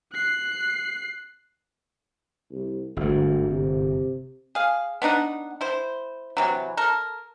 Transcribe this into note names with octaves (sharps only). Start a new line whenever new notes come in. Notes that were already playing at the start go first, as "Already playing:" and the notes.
F#6 C7
C2
G1 D2 G#2
C3
G#4 F5
B3 D4 D#4 F#5
E4 C5
C3 E3 F#3
A4 A#4